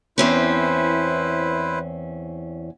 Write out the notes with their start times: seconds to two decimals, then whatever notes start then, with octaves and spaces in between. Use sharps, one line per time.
0.18 E2 C4 C#4 E4 B4 C5